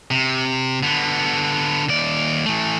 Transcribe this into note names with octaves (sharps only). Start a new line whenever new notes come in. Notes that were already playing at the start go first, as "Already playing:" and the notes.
C3
D3 B3
D#2 D5
E3 A3